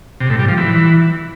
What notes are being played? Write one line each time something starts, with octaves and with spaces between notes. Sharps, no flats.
C3
A2
G3
F3
E3